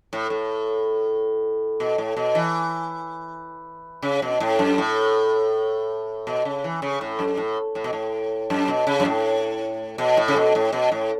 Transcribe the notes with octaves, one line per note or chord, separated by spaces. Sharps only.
A2
A2
B2
A2
B2
E3
C#3
B2
A2
F#2
A2
B2
C#3
E3
C#3
A2
F#2
A2
A2
B2
A2
F#2
B2
C#3
F#2
A2
B2
A2
C#3
B2
A2
B2
A2